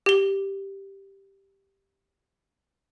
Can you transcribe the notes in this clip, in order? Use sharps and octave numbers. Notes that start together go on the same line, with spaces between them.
G4 G7